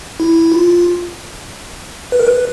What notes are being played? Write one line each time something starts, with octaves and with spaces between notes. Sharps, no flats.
E4
F4
B4
A#4
B4